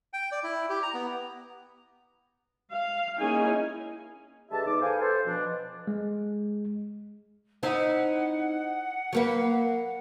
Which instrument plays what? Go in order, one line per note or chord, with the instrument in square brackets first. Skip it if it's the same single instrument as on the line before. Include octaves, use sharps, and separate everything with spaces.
[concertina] G5
D5
E4
G4
A#5
B3
[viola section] F5
A#3 C#4 D#4 E4 G#4 G#5
[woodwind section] D3 G#3 G4 B4 E5 A5
E2 D#4 D6
A4 B4 C5 F5 G5 G#5
A4 C5
B2 F3 D4
[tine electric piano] G#3
[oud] C4 D#4 E4 [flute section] F#5
[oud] F#3 A#3 B4